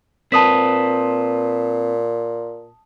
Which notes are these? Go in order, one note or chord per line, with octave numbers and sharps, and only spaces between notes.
A#2 C4 B4 A5 D#6 B6